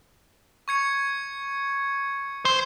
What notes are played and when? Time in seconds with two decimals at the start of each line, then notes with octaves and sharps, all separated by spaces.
0.68 C#6 G#6 C#7
2.45 C5